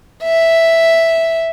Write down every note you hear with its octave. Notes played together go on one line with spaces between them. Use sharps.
E5